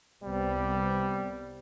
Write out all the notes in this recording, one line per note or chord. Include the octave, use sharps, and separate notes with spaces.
C2 C3 G3 B3